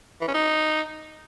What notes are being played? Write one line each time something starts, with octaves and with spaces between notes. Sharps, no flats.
E3
C#4
D#4